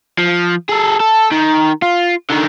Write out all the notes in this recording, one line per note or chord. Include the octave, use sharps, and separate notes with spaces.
F3
G#4 A4
A4
D#3
F4
D3 D#3